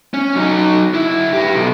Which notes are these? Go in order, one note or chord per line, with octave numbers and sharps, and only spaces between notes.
C#4
F#3 D#4
F#2 E4
G4 B4
B1